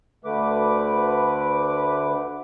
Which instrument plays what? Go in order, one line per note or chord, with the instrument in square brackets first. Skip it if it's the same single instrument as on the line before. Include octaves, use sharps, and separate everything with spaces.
[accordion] D2 D3 A3 B4 D6